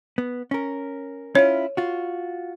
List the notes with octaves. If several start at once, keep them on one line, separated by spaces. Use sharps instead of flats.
B3
C#4 A#4
C#4 E4 F4 C#5
F4 F#4